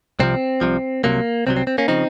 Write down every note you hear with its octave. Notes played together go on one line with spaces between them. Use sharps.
C2 C3 F3 C4
C2 C3 F3
C2 C3 F#3 A#3
C2 C3 F#3 C4
C4
C4
A#3 C#4
C#3 F3 C4 D#4